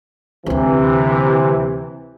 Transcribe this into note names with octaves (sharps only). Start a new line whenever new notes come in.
D2 C3 E3 A#3